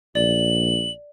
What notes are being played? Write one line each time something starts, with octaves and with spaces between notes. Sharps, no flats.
A#1 D5 F#7